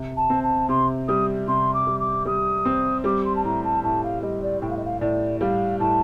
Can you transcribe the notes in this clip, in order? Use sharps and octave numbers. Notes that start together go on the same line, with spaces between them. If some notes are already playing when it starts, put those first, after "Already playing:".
Already playing: C3
A5
C4
A5
C3 C6
G3 D#6
C3 C6
D6
G3
D6
G3 D#6
C4
G3 D6
C6
A5
A2 A#5
A5
A2 A5
F5
G3 D#5
D5
A2 G5
F5
D#5
F5
A2 D5
G3 F5
A2 A5